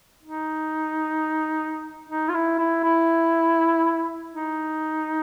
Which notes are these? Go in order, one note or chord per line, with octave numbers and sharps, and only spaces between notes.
D#4
D#4
F4
E4
E4
E4
D#4